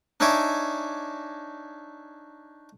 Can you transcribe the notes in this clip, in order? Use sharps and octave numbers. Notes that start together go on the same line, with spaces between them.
D4 D#4 C#5 E5 G#5 D6